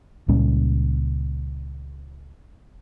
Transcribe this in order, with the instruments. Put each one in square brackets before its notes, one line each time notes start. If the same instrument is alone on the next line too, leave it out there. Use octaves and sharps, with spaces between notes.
[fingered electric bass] C#2 A#2 G3 C#4